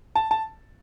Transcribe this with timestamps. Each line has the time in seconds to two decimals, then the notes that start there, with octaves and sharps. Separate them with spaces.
0.16 A5
0.31 A5